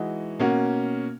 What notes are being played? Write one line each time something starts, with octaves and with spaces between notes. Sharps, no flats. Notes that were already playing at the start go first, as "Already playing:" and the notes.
Already playing: E3 G#3 D#4 F#4
B2 A#3 C#4 F#4